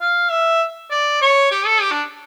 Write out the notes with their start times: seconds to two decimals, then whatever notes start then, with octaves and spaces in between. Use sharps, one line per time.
0.01 F5
0.31 E5
0.91 D5
1.22 C#5
1.51 G4
1.66 A4
1.81 G4
1.91 D4